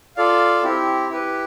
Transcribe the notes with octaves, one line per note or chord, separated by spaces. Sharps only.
F4 A4 D5 F5
C4 E4 G4
E4 G4 B4